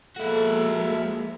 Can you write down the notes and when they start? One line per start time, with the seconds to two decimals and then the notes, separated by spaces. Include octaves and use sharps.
0.16 F3 G#3 A#3 E4 F#4 A4